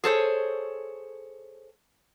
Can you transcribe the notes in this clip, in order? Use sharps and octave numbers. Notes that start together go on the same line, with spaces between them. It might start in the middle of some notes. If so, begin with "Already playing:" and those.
G#4 A4 C5 C#5